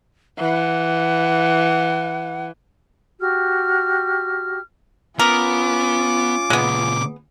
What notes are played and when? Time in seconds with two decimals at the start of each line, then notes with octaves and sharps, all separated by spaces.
0.39 E3 F#5
3.20 F#4 G4 F6
5.19 B3 C#4 F4 A#4 D6
6.50 A#2 C#3 G#3 B3